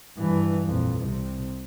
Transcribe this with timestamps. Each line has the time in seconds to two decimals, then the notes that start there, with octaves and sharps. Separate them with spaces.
0.17 G2 E3
0.65 A#1 F2
1.00 C2 C3